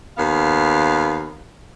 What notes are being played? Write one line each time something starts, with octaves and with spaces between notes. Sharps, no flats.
D#2 B3 F5